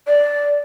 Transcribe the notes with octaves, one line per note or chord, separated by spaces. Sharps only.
D5